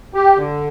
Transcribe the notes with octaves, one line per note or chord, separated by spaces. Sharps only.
G4
D3